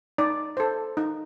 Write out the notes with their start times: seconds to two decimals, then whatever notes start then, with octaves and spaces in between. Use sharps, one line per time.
0.18 D#4 D5
0.57 A4 C5
0.97 D#4